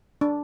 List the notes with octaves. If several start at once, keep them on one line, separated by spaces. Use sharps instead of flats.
D4